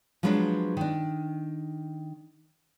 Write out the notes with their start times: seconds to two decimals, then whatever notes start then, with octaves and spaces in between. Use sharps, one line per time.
0.23 F3 F#3 G#3 B3 C4 D4
0.77 D#3 D4